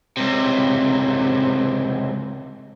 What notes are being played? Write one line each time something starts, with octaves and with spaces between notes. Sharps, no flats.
C#2 C3